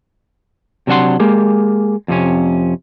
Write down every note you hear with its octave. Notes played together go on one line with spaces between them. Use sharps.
C3 F#3 D4 F#5 C6
G#3 A#3 G4
F2 C3 C#4